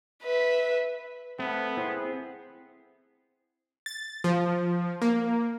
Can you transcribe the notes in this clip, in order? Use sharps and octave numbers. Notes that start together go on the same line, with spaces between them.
B4 E5
A3 B3 C4
C4 E4 G#4 C5
A6
F3
A#3